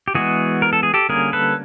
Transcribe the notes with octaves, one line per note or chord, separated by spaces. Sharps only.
G4
E3 G#3 B3 F#4 G#4
A#4
A4
G#4
G4 A4
D3 G3 A#3 C#4 G#4 A#4
A4 B4